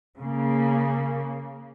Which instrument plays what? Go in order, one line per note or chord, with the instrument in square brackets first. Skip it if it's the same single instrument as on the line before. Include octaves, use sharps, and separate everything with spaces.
[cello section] C#3 A#3